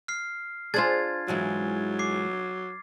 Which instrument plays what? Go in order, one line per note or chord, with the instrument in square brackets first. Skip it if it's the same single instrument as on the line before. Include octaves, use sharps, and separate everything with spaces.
[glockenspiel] F6 C7
[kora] D4 F4 [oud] G#4 C5 [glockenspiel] G#6 A6
[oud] G#2 E3 G#3 [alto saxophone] F#3
[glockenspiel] D6 C7